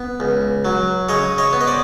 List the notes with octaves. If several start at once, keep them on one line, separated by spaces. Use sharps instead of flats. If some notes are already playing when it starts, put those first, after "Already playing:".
Already playing: B3
C#2
F#3
C#3 C#5 D#5
C#5 D#5
B3
D#5
C5 D5